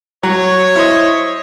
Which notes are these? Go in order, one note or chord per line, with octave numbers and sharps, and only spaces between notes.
F#3 C#5
E4 C5 D#5